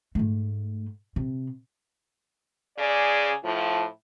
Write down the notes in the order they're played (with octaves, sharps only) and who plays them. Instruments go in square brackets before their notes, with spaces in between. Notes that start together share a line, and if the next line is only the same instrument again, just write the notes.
[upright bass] G#2 A3
C3
[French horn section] C#3 G#4 D5
A2 F3